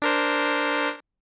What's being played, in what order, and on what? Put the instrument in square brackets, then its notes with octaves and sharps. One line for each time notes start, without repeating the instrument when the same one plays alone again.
[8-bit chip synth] D4 A#4 C5